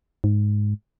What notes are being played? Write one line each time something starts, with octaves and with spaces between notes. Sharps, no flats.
G#2